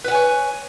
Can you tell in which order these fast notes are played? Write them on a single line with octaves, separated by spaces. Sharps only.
B4 F#5 G#5 C#5